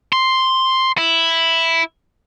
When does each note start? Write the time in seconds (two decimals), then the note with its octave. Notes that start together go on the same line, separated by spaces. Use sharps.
0.13 C6
0.98 E4